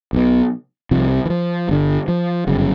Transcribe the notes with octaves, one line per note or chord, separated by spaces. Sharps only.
B1 B2
C2 C3 F3
E3
F3
G1 G2 D3
F3
G1 F#2 C#3